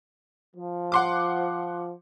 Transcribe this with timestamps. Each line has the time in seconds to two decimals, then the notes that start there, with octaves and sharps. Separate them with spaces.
0.56 F3
0.92 F#5 C6 D6